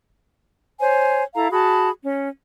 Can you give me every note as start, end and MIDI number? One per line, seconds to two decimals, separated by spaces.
0.80 1.23 72
0.80 1.23 73
0.80 1.23 80
1.34 1.50 64
1.34 1.50 69
1.34 1.50 77
1.34 1.50 82
1.52 1.89 66
1.52 1.89 68
1.52 1.89 81
1.52 1.89 83
2.02 2.27 61